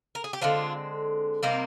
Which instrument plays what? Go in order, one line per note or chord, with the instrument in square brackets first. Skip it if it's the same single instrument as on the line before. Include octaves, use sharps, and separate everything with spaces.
[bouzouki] A#4
G#4
G4
D3 G#3 C4 D4 F4
C3 G3 A#3 C4 D#4